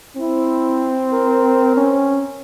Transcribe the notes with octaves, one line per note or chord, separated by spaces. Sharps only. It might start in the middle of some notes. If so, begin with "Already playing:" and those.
C4 E4
A#4
C#4